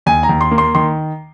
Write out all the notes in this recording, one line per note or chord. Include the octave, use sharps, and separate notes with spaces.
D#2 G#5
A#5
D#2
C6
A#3
C6
D#3 C6